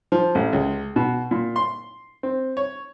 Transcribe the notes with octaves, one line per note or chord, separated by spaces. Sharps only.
F3
A1
C#2
B2
A#2
C6
C4
C#5